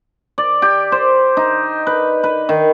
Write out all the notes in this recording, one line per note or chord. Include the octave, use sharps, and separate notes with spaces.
D5
G4
C5
D#4
B4
B4
D#3